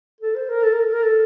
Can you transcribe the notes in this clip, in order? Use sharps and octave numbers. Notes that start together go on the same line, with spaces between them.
A4
C5
A#4
A4
A#4
A4
A#4
A4